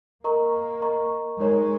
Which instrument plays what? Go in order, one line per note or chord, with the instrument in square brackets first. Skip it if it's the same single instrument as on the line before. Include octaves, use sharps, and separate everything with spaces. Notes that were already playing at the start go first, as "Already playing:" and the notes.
[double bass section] A#3 [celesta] A#4 D#5 A#5 C#6
[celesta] A#4 D#5 A#5 C#6
[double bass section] G#3 [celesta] D#4 A#4 C#5 A#5 C#6